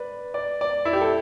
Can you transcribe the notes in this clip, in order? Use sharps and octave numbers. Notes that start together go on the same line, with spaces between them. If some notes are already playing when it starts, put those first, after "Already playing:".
Already playing: B4 D5
D5
D5
E4
G4
A4